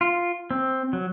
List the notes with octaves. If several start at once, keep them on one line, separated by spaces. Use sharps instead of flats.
F4
C4
F#3